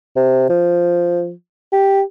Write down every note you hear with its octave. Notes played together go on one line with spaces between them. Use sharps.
C3
F3
G4